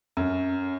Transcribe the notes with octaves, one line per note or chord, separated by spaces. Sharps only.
F#2